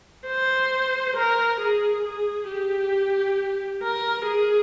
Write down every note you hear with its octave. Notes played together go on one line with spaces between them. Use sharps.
C5
A#4
G#4
G#4
G4
A#4
G#4